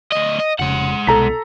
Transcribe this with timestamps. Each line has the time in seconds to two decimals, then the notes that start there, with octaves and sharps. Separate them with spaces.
0.12 D2 D#5
0.39 D#5
0.59 F1 C#3 G#3 F#5
1.07 C2 B2 A4 A#5 B6